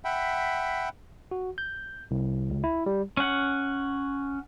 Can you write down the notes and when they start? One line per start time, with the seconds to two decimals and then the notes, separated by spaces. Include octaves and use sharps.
0.05 E5 F#5 G5 B5
1.31 F#4
1.58 G6
2.11 C2
2.50 C#2
2.64 E4
2.86 G3
3.17 C#4 F#5